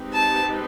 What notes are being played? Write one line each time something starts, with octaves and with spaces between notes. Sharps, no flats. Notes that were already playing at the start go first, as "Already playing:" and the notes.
Already playing: G#3 C4 D#4 G4 B4
A5